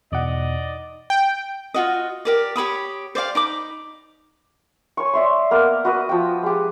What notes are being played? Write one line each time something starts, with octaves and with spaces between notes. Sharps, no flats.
E2 B2 D#4 D5 D#5 F#5
G5
F4 F#4 D#5
G4 A#4 D5
G4 C#5 B5 D#6
C5 D5 F5 G5
D#4 B5 D6
C#5 G#5 C#6
D5 E5 C6
A#3 B3 A#4
F#4 B4 D#5
F3 G5
G#3 G4